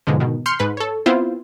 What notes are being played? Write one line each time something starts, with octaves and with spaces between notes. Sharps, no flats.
G#2 B2 D3 F3
B2 D#3
C6 F6 G6 C#7
G#2 B4 B5
A4 C#5
B3 C4 E4 F4 C5